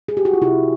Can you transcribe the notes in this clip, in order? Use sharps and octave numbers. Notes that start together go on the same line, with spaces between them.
G#4
G4
F#4
F4
C3 E4